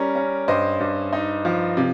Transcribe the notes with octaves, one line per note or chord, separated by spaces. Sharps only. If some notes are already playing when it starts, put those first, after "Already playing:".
Already playing: G3 C#4 A#4
C#4
G2 C5 D#5
G2
D#4
F3
C3